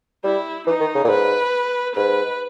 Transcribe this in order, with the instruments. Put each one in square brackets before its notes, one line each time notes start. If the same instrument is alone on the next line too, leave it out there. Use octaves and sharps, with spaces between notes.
[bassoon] G3 [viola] E4
[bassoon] E3 [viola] D#4
[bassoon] D#3
C#3
A#2
[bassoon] G#2 [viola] B4
[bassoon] G#2 [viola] B4